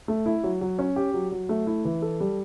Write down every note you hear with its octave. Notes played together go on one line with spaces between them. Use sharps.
A3
E4
F#3
F#3
C#4
G4
F#3
F#3
A3
E4
E3
A4
G3